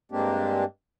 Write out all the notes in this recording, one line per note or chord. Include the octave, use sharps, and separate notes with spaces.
G2 G#3 A#3 C4 D4 G4